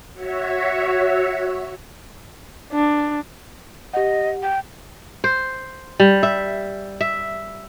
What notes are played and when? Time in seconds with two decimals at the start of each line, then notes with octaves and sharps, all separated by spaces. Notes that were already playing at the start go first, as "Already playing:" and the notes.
0.14 F#4 C#5 E5
2.72 D4
3.94 G4 D#5 F#5
4.43 G5
5.24 C5
6.00 G3
6.23 E5
7.01 E5